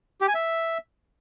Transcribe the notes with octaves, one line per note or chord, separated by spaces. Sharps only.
G4
G#5
E5